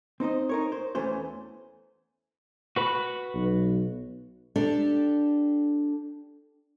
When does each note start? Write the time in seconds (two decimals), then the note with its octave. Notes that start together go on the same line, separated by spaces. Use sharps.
0.20 C4 D#4 C5 D#5
0.49 D#4 A#4 C#5
0.72 C5
0.95 E2 E3 A3 C#4 C5
2.76 F#4 B4 B5
3.34 B1
4.56 D4 G4 A4